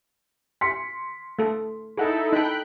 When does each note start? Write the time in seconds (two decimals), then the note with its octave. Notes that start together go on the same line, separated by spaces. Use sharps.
0.61 C6 B6 C#7
1.39 A3 A4
1.97 D#4 E4 G#4 A4 F#5
2.33 D#4 A4 G5 B5 F#6